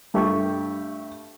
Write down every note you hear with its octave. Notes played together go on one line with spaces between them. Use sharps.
G2 A3 G4 C#6